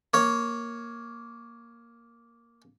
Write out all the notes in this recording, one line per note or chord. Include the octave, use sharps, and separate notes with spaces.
A#3 C#5